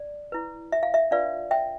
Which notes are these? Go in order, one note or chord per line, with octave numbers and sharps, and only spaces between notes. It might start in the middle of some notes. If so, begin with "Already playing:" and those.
Already playing: D5
E4 B4
E5
F5
E5
D4 F4 B4 D5 F5
E5 G5